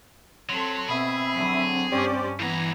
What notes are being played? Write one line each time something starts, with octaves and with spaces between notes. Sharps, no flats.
F#3 C4 A4 C6 B6
B2 C4 G#4 E5 B5
D3 F#3
G2 C#4 G4 C5 D5
G2 E3 B3 A#5 G#6